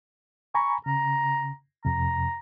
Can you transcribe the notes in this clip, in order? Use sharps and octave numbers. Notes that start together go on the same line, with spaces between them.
G#5 A#5 B5 C#6
C#3 A#5
F2 C3 A#5